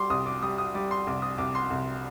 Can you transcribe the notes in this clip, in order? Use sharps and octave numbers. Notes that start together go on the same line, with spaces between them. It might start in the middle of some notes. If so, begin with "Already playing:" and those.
Already playing: G3 C6 D6
C2 D#6
D6
G3 D#6
D#6
G3 D6
C6
C2 D6
D#6
C2 D6
C6
C2